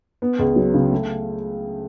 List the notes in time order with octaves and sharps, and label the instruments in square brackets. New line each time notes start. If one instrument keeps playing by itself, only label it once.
[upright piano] B3
C#2
F#3
C#3
A3